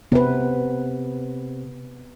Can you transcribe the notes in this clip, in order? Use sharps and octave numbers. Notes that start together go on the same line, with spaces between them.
C3 B3 B4